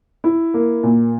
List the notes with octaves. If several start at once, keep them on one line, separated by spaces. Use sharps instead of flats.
E4
A#3
A#2